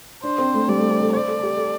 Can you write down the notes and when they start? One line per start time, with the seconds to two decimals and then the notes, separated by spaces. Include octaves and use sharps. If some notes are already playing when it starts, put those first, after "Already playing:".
0.23 D4 C5
0.38 C4
0.54 A3
0.68 G3 D5
0.80 A3
0.90 C4
1.01 A4
1.13 C5 D5
1.28 A4
1.43 G4
1.58 A4